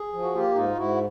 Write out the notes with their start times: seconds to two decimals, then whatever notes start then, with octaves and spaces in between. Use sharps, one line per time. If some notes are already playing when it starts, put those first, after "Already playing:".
Already playing: G#4
0.13 F3
0.22 F#4
0.34 A#3 F4 G4
0.55 G#2 D#4 F4
0.77 G#2 E4 F#4